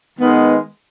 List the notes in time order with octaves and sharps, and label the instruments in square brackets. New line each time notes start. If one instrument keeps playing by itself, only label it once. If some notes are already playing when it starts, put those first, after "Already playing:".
[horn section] D#3 G#3 B3